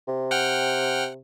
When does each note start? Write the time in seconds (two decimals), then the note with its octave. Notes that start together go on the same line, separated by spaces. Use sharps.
0.08 C3
0.31 F#5 G5 F6